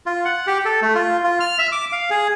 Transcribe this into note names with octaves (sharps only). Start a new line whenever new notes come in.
F4
F#5
G4
A4
A3
F4
F4
F6
E5
D6
F5
G#4